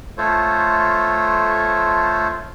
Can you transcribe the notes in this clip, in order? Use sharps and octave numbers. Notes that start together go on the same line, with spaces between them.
A3 F4 A4 C5 C#5